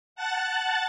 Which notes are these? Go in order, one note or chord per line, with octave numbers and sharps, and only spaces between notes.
F#5 A5 F#6 A6